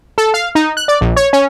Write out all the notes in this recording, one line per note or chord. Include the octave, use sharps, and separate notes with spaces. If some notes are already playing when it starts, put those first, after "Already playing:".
A4
F5
D#4
F#6
D5
A#1
C#5
C#4